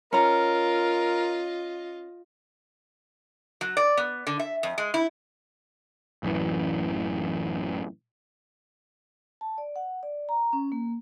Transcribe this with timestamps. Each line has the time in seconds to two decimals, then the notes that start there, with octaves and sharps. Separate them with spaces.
0.13 C#4 F4 A#4 D#5 A#5
3.61 F#3
3.77 D5
3.97 B3
4.27 D3
4.39 E5
4.63 F2
4.78 G#3
4.94 E4
6.23 A1 F#2 E3
9.41 A5
9.58 D5
9.76 F#5
10.03 D5
10.29 A#5
10.53 C#4
10.72 A#3